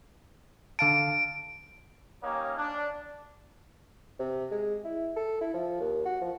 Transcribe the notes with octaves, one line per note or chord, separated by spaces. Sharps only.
D3 F5 A5 D7
A#3 C#4 D#4 G4 C#5
D4
C3
G#3
E4
A4
E4
F3
D#2
F#4
F3